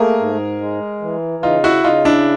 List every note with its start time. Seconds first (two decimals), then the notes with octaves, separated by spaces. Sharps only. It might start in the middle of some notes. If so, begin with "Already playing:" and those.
Already playing: A3 A#3 G#4 A#4
0.20 G#2
0.60 G#3
1.02 E3
1.43 C#3 D#4 F4
1.64 E4 F#4
1.84 C#3 D#4 F4
2.05 D4 E4